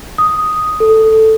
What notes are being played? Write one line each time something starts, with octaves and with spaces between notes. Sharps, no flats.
D#6
A4